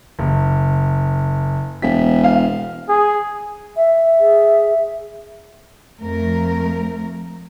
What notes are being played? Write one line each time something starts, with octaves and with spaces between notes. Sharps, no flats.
F#1
E1 B6
F5
G#4
E5
G#4
F2 F3 A3 A#4